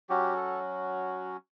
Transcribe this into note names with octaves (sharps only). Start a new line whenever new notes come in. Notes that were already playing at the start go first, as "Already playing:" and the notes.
F#3 C#4 F#4 G4
A4